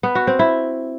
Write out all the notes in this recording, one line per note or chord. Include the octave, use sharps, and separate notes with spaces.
B3
F#4
C4
E4